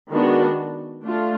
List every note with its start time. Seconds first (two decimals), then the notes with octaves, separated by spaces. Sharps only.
0.11 D#3 G#3 B3 D4 F#4
1.04 A3 D4 F4